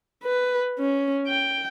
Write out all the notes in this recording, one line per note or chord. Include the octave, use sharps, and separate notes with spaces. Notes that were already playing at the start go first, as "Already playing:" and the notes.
B4
C#4
G5